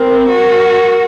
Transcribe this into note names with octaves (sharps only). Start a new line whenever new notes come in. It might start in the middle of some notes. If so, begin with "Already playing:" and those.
Already playing: C4 A#4
F#4